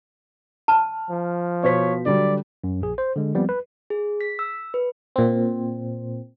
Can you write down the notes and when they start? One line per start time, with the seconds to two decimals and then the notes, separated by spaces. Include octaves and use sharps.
0.68 A5 F6
1.10 F3
1.63 B2 C5 C#5 B6
2.06 D3 F#3 G3 D5
2.64 F#2
2.82 A#1 G#4
2.98 C5
3.16 D3 G#3
3.35 F3 G3 B3 C4
3.49 B4
3.90 G#4
4.21 B6
4.39 E6
4.74 B4
5.16 A#2 C4